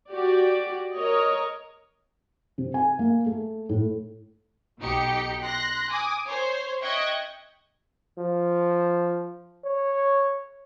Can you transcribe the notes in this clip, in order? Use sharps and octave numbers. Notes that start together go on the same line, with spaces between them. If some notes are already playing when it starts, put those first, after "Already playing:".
F#4 G4 D5
A#4 C#5 D#5
C3
G#5
A#3
A3
A2
B1 B2 D#4 G4 C#7
C6 F#6 A#6
G#5 D6 D#6
C5 C#5
D#5 E5 G5 C#6 F#6 G#6
F3
C#5